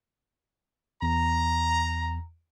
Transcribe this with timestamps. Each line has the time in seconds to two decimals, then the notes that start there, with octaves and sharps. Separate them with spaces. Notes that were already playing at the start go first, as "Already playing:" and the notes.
1.02 E2 A#5